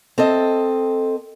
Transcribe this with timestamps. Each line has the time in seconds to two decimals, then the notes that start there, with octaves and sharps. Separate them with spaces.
0.18 C4 A4 D#5